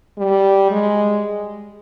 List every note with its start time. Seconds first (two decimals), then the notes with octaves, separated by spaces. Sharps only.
0.18 G3
0.71 G#3